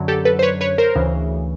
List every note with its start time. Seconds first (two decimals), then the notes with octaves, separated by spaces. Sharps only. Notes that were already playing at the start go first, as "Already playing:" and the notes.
Already playing: F#2 D3 F#3
0.08 G4 A4
0.25 A4 B4
0.39 C5
0.43 B4 C#5
0.61 B4 C#5
0.78 A#4 C5
0.95 D2 C#3 E3